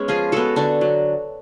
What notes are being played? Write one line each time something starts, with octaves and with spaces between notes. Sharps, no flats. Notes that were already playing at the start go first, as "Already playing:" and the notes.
Already playing: G#3 B3 C#4
F3 F4 G#4
G#3 B3 F#4 A4
D3 D4 F#4
F#3